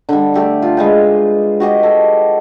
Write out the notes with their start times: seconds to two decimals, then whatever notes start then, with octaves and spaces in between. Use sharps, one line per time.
0.09 D3 G3
0.34 A3 G4 A4
0.62 F4
0.77 G#3 B4 G5
1.60 F#4 G4 D#5
1.83 A4